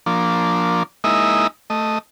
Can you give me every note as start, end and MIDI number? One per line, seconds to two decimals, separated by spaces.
0.06 0.83 53
0.06 0.83 58
0.06 0.83 62
1.04 1.47 56
1.04 1.47 58
1.04 1.47 63
1.04 1.47 64
1.04 1.47 75
1.04 1.47 76
1.70 1.98 57
1.70 1.98 75